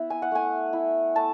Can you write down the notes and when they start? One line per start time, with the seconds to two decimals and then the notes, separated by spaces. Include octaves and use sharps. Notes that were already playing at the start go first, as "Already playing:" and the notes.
Already playing: B3 E4 E5
0.10 G#5
0.22 F#5
0.32 A3 G#5
0.73 E4
1.15 A3 A5